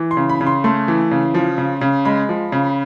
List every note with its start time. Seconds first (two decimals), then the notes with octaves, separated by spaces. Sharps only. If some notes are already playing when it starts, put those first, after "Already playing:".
Already playing: E3
0.11 C6
0.17 C#3
0.29 B5
0.41 C#3
0.46 C6
0.64 A3 C6
0.88 E3
1.11 C#3
1.34 F3
1.58 C#3
1.81 C#3
2.05 G#3 B5
2.29 F3
2.52 C#3